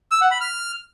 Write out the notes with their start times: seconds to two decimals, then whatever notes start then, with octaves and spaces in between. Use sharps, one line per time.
0.11 E6
0.21 F#5
0.31 B5
0.41 F6